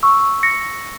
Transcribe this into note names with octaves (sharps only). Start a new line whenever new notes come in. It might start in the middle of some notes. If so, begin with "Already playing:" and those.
C#6 E6
A#6 C#7